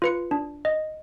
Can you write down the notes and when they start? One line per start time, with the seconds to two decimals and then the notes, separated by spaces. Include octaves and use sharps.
0.02 F4 B4 C#7
0.31 D4
0.65 D#5